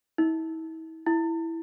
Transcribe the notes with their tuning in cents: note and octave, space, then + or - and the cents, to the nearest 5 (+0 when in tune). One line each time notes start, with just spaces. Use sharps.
E4 -40
E4 +0